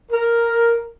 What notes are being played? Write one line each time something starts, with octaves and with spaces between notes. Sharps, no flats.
A#4